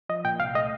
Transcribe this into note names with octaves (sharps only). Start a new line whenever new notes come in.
F3 D#5
A#2 G5
C2 F5
A3 D#5